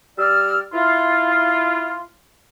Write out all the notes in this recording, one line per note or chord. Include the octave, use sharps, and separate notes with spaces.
G3 D5 E6 F6
E4 F4